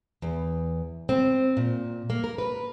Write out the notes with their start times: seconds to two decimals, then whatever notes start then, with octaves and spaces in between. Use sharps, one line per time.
0.22 E2
1.09 C4
1.57 A#2
2.10 A#3
2.24 A#4
2.38 B4